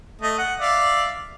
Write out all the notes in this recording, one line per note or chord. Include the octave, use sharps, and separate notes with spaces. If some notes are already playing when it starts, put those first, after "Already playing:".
A3 D#5
F#5
D5 E5 F5